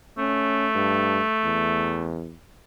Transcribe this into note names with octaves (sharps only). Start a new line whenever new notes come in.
A3 C#4
G2
E2